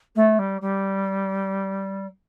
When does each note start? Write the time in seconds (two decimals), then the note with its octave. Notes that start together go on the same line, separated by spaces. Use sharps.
0.15 A3
0.38 G3
0.61 G3